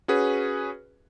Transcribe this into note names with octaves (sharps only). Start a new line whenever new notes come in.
C#4 F#4 G#4 B4